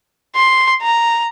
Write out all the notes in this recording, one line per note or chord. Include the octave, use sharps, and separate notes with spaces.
C6
A#5